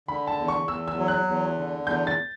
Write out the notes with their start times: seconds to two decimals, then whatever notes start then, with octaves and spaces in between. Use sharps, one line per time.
0.08 D3 B5
0.27 A5
0.38 E2
0.48 C#6
0.68 E2 E6
0.88 E6
0.97 F#3
1.08 F#6
1.27 E2
1.58 D3
1.87 E2 G6
2.07 A6